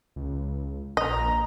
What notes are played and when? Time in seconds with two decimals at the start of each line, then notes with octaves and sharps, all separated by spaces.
0.16 C#2
0.97 A#1 D#5 A#5